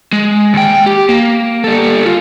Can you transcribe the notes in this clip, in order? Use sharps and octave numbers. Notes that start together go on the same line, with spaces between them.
G#3
D#2 G5
G4
A#3
G3 A4
F4